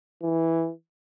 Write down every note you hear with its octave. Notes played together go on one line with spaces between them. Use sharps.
E3